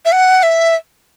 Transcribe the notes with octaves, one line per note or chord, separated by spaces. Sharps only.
E5
F#5
E5